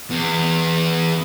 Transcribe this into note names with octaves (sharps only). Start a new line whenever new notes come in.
E2